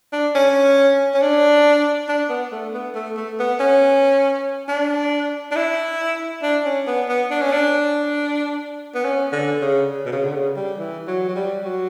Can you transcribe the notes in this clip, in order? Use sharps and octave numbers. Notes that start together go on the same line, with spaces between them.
D4
C#4
C#4
D4
D4
B3
A3
B3
A3
A3
B3
C#4
D4
D4
E4
D4
C#4
B3
B3
D4
C#4
D4
B3
C#4
D3
C#3
B2
C#3
D3
C#3
G3
E3
F#3
F#3
G3
F#3